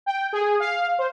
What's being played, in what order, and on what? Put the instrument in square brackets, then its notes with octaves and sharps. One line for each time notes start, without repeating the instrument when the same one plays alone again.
[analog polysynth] G5
G#4
F5
C5